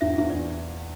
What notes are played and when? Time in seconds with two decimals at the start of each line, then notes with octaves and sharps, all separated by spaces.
0.01 E2 E5
0.18 E2 E5
0.30 D5